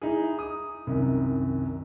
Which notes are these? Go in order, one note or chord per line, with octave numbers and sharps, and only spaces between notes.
D#4 E4 G#4
D#6
C2 F#2 D#3